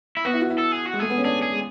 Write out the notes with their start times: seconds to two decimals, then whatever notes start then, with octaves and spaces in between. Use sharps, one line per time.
0.17 E4
0.25 B3 F#4
0.33 E4
0.42 F#4
0.50 E4
0.59 A4
0.73 G#4
0.86 F#4
0.94 G#3
1.00 A3 G#4
1.10 B3
1.17 C#4
1.24 D4 G#4
1.42 G#4
1.52 G#3